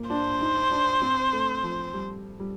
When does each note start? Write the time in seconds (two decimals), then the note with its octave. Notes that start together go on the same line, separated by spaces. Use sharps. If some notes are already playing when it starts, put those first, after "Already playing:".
Already playing: A#3
0.10 D4 C5
0.41 D#4
0.71 D4
1.02 C4
1.33 A3
1.63 F3
1.94 G3
2.40 G3